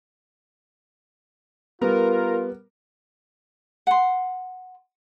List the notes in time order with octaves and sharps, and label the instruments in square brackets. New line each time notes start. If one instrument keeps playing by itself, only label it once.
[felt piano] G3 B3 [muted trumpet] F4 [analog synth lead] A#4
[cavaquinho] F#5 C6